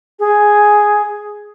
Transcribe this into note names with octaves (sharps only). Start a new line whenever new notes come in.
G#4